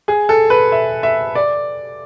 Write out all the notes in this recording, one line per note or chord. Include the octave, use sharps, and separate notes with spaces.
G#4
A4
B4
E5
E5
D5